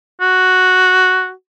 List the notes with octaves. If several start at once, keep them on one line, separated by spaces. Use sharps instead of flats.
F#4